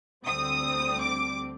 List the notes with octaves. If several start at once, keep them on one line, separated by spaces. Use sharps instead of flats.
D2 D3 G3 C4 D#6
D6